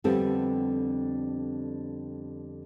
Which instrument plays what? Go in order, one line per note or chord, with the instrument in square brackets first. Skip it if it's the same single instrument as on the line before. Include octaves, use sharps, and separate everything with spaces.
[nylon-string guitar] F2 D3 G3 B3 C4 A4